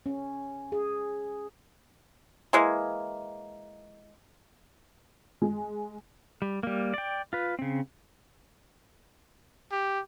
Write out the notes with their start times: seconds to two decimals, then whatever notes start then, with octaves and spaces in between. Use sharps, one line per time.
0.06 C#4
0.72 G#4
2.53 E3 G#3 A#3
5.42 G#3
6.42 G3
6.63 G3 A#3
6.94 D5 G5
7.33 F4 B4
7.59 C#3 C4
9.72 G4